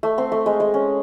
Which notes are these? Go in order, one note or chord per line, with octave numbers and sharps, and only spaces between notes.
A3
C4
A3
G#3
G#3
C#4